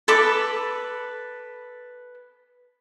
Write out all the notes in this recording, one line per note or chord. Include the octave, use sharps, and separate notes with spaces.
A4 B4 B5 D6